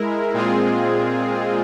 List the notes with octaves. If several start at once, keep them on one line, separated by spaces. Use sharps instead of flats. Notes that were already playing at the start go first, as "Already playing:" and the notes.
Already playing: G#3 E4 A#4
A#2 G#3 C4 F4 G#4